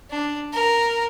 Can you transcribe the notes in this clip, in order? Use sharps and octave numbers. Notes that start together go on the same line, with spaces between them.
D4
A#4